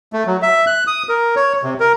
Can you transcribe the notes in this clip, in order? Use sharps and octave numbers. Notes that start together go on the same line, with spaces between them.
A3
F#3
E5
F#6
D#6
A#4
C#5
C3
A#4